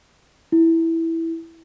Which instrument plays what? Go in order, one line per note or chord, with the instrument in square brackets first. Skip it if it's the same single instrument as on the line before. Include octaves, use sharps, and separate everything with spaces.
[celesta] E4